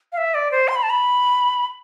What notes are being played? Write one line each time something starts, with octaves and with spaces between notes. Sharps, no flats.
F5
E5
D5
C5
C6
B5
A5
B5